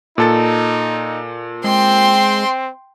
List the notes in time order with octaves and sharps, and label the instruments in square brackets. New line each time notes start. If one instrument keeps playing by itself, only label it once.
[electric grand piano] A#2 A4 A6 [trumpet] D#4
[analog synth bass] G#3 [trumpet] C4 [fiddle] G5 C6